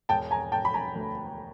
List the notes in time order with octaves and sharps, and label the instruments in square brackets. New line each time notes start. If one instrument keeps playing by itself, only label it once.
[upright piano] E1 G5 A5
G#5 A#5
E1 G5 A5
B5
G#5 A#5
D2